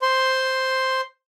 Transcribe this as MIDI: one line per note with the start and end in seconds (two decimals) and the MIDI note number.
0.02 1.01 72
0.02 1.01 84